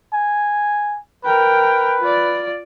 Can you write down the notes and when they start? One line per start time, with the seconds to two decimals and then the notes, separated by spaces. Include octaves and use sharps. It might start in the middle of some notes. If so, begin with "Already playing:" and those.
0.13 G#5
1.25 A#4 B4 G5
2.00 F4 D5